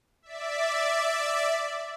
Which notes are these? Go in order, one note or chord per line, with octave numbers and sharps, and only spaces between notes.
D5 E5